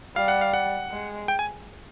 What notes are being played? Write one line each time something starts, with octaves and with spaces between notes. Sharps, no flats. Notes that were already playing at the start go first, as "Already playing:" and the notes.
G3 F5
F#5
F5
F#5
G#3
G5
G#5